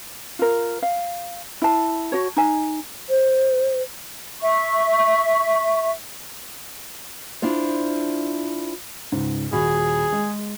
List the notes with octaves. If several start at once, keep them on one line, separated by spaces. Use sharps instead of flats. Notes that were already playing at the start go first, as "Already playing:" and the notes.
F4 A#4
F5
E4 A5
F#4 C#5
D#4 G#5
C5
E5 C#6
D4 E4 F4 C5
C#2 G#2
D#1 F#4 G#4 B5
G#3